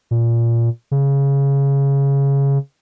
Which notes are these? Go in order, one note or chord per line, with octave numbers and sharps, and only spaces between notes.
A#2
C#3